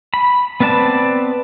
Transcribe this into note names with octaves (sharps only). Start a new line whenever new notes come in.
B5
B3 C4 B4 D5 A5